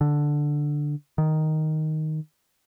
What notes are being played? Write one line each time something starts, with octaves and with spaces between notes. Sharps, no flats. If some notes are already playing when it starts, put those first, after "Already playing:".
D3
D#3